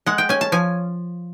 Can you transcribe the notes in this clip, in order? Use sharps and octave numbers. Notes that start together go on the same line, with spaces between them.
G#3 F#5
G5
C#4 G#5
A5
F3 G#5